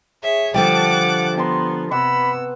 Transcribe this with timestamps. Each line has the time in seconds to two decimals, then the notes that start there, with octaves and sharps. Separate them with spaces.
0.22 G#4 C#5 E5
0.54 D3 F3 G3 F#5 G5 A5 D6
1.37 B3 A5 A#5 C6
1.91 C3 B3 F#5 B5 D6 E6